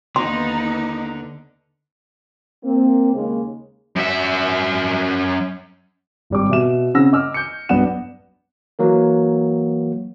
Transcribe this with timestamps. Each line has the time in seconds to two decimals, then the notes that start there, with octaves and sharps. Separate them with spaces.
0.16 D#2 D3 B3 D#4 C6
2.64 A#3 C4
3.14 D#2 C#3 G#3 A#3
3.96 F#2 E5
6.30 G#1 G3 D6
6.49 B2 E5 E7
6.94 C#3 C4 F#5 E6 A#6
7.13 D#5 D6 E6 F6
7.34 G6 C#7
7.69 B1 G2 B3 D5 F#5 E7
8.79 E3 F#3 A#3 A#4